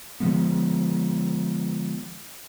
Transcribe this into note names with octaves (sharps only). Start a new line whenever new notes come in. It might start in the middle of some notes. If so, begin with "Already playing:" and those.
D3 F3 G#3 B3